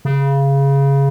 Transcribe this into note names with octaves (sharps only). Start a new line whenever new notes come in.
C#3